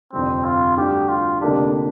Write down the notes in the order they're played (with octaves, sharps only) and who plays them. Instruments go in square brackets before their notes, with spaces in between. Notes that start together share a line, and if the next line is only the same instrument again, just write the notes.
[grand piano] G1 F2 C3 G3 [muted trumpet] C4
[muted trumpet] F4
[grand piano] D2 D3 G3 D4 [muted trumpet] G4
[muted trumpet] F4
[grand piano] F1 F2 D3 A#3 G4 [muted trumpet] D4